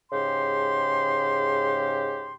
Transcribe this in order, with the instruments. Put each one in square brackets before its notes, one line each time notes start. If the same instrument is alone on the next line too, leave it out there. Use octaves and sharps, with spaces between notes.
[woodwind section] G#2 C#3 G4 C6